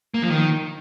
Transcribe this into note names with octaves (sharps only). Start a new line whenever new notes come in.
A#3
F3
D#3